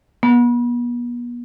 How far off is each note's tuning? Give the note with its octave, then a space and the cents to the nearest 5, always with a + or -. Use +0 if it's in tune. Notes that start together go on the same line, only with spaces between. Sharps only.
B3 -40